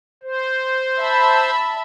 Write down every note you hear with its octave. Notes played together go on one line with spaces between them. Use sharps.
C5
E5 A5 B5